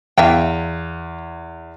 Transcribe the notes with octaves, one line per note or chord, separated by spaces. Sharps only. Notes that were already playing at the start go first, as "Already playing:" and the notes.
E2 E5 F5 G5